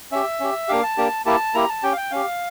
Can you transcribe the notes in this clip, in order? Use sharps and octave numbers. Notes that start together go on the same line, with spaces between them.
C#4 G4 E5
C#4 G4
A#3 D4 G4 F5
A5
A#3 D4 G4
A#3 E4 G4 A5
A#3 E4 G4 A#5
A5
C#4 G4 G5
F5
G5
C#4 G4 F5